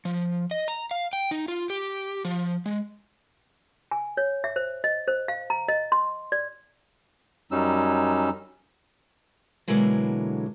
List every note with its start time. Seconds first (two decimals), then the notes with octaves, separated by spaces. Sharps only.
0.05 F3
0.51 D#5
0.68 A#5
0.91 F5
1.13 G5
1.31 D#4
1.48 F4
1.70 G4
2.25 F3
2.66 G#3
3.91 G#5
4.17 C#5
4.44 E5
4.56 C5
4.84 D#5
5.08 C5
5.28 F5
5.50 A#5
5.69 D#5
5.92 C6
6.32 D5
7.52 F#2 F#3 G3 C#4 D#4 E6
9.68 B2 D3 E3 F#3 G#3 A#3